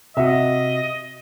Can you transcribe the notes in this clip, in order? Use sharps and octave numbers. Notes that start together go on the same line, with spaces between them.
C3 F#4 D#5 E5